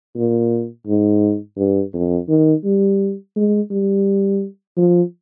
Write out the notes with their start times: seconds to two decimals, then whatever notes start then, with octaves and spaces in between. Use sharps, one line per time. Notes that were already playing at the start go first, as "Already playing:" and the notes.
0.16 A#2
0.87 G#2
1.57 G2
1.93 F2
2.29 D#3
2.65 G3
3.36 G#3
3.71 G3
4.77 F3